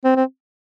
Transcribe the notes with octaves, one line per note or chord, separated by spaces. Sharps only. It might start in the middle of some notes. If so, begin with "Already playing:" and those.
C4
C4